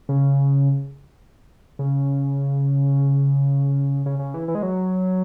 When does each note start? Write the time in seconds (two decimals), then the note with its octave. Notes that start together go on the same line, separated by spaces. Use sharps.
0.09 C#3
1.79 C#3
4.06 C#3
4.19 C#3
4.34 E3
4.48 E3
4.55 G#3
4.63 F#3